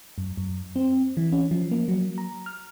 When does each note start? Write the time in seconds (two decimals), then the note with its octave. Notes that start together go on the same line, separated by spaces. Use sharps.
0.18 F#2
0.37 F#2
0.76 C4
1.17 E3
1.32 C#4
1.51 F3
1.71 A#3
1.88 F#3
2.18 A#5
2.46 F6